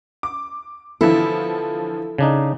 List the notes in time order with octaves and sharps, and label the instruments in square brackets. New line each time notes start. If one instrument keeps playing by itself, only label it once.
[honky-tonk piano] D6
[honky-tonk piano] D3 E3 F3 [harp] E4 [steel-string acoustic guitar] A4
[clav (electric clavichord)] C#3 D4 D#4